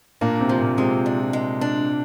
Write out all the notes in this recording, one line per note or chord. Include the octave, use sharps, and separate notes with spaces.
A#2 A#3 D4
C3 C4
F3
A#2 A#3
C3 G#3 C4
D4
G#3
D4